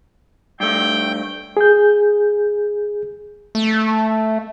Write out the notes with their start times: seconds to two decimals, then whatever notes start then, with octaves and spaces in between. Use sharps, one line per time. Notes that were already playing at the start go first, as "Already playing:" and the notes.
0.60 G2 A3 G5
1.57 G#4 G6
3.55 A3